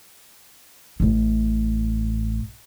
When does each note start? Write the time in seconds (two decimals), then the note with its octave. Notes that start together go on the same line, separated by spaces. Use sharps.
1.00 A1 A2